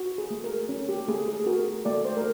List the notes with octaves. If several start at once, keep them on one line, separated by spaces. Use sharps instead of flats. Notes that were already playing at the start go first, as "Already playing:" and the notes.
Already playing: F#4
G#4
A3
A#4
C#4
G4
A3 G#4
G#4
F#4 A#4
A3 D5
C5
A#4